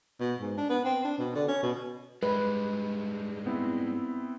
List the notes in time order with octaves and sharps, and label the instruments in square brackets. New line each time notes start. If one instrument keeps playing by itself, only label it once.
[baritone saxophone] B2
G#2
D4
B3
C4
D4
B2
D3
C#4
B2
[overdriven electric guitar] G#2 G3 [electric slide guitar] G#3 [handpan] B4
[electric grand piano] B3 C4 E4